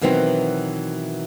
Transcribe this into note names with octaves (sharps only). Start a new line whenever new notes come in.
B2 D#3 E3 F#3 C4